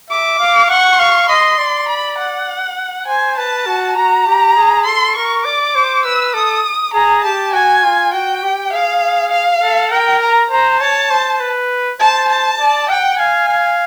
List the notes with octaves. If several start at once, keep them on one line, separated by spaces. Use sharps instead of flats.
E5 D6
F5
F#5 C#6
F5
D#5 C6
D5
B5
F#5
C5 G#5
B4 A5
F#4
F#4 A#5
G4
G#4
A4 C6
A#4 C#6
D5 D6
C5
B4 E6
A4 D#6
G#4 A#5
G4 A5
F#4 G#5
F4
F#4 G5
G4
G#4 F5
F5
A4
A#4 G5
A#5
C5 A#5
C#5 A5
C5
B4
C5 A5
A5
D5
F#5 G5
F5 G#5
F5